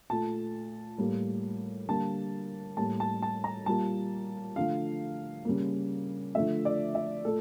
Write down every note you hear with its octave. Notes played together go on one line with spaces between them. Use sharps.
A#2 A3 A5
A2 G3 A#3
D3 G3 A#3 A5
A2 G3 A#3 A5
A5
A5
A#5
A#2 G3 A#3 A5
D3 F3 A3 F5
C#3 G3 A#3
D3 F3 A3 E5
D5
E5
A#2 A3 A4